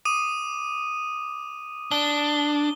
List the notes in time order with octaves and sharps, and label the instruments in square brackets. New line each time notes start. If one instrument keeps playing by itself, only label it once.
[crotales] D6 D#6 D#7
[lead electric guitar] D4 [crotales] G7